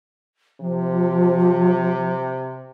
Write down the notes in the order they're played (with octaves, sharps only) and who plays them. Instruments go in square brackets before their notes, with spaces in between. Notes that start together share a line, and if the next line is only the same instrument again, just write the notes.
[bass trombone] C3 [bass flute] F3